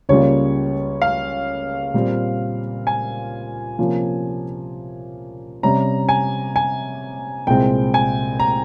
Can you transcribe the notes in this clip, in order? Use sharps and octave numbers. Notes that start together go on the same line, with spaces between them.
C#2 C#3 G3 A#3 F4 C#5
F5
A#2 G3 C4
G#5
C3 F3 A#3 C#4 F4
C3 G3 C#4 A#5
G#5
G#5
C2 A#2 G#3 C4 G5
G#5
A#5